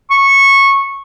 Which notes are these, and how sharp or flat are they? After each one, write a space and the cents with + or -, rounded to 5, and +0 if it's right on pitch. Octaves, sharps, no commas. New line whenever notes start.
C#6 -15